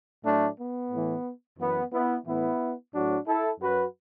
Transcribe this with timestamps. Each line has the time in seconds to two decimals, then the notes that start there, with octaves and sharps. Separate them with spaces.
0.23 A2 F#3 A3 D4
0.57 B3
0.91 A2 E3
1.58 F#2 E3 B3
1.91 B3 E4
2.25 A2 E3 B3 E4
2.93 A2 F#3 D4 F#4
3.26 E4 A4
3.60 F#2 F#3 F#4 B4